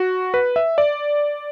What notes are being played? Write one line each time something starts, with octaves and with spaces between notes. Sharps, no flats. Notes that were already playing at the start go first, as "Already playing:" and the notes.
Already playing: F#4
B4
E5
D5